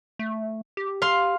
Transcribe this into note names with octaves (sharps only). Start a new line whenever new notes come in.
A3
G4
F5 C6